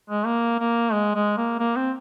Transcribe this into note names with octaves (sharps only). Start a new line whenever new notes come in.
G#3
A#3
A#3
G#3
G#3
A#3
A#3
C4